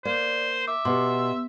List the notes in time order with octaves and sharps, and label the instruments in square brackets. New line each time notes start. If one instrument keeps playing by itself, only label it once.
[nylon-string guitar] A#3 [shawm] C5 [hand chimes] D5
[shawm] E5 [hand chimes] D6
[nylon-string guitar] B2 [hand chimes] G4 B4 C6